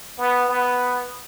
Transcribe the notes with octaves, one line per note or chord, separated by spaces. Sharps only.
B3
B3